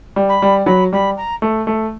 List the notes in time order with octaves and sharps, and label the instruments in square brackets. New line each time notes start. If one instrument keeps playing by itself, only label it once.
[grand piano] G3
[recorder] B5
[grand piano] G3
[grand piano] F#3 [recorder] B5
[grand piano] G3 [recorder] B5
[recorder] A#5
[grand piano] A3
A3